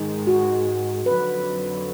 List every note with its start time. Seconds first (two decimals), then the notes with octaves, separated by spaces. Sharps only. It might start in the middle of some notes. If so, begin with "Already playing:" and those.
Already playing: G#2 D#3 G#3 D#4
0.27 F#4
1.06 F2 D3 F#3 B4